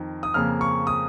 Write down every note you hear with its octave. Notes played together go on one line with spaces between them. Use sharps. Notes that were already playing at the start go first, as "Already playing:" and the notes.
Already playing: F2 D#3
D#6
F2 C#3 A#3 F6
C#6
D#6